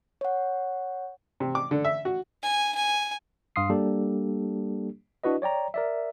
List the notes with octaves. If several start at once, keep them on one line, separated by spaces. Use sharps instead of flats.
C#5 F#5
C3
D6
D3
E5
F#4
G#5
G#5
G2 F5 C6 D#6 C7
G3 A#3 D4 G4 A4
D4 E4 F#4 B4 D#5
C#5 D5 G5 A#5
A#4 D5 E5